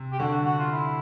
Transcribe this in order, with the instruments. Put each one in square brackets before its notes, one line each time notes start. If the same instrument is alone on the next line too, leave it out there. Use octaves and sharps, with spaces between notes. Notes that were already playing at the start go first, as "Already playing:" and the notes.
Already playing: [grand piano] C3
[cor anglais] G4
[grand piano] D3 [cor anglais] F#4
[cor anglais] F#4
F#4
F4
E4